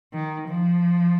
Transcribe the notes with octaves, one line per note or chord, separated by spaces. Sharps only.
D#3
F3